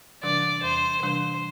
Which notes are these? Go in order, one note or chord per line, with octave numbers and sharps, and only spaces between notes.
C3 E3 G3 D4 D5
E2 C5
C3 E3 G3 D4 C5